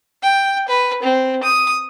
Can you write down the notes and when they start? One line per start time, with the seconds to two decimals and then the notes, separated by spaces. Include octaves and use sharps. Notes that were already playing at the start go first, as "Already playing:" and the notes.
0.23 G5
0.69 B4
1.03 C4
1.43 D#6